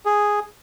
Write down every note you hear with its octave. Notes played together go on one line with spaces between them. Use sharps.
G#4